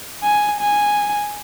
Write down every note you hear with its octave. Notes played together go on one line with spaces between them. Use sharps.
G#5
G#5